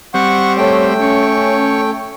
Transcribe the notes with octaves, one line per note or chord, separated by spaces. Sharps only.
G3 C4 F#5 C#6
A3 C#5 G5
C#4 C#5